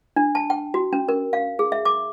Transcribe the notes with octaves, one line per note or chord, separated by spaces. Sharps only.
D4
A5
G5
F#4
C#4
A#4
F5
G#4
E5
D6